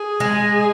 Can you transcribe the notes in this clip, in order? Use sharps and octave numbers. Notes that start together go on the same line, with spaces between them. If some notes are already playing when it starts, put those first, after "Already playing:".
Already playing: G#4
G#3